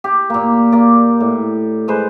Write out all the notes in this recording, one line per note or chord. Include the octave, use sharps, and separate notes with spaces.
G4
A#2 A#3
A#3 D5
A2
G#3 B4 C5